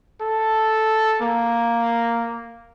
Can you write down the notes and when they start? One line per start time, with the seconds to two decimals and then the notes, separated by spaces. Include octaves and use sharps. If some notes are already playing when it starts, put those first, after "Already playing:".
0.21 A4
1.21 A#3